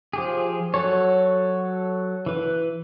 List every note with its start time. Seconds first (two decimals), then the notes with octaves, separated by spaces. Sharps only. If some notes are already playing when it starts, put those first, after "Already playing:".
0.13 F3 G4 G#4
0.74 F#3 F#4 A4 C#5
2.26 E3 B4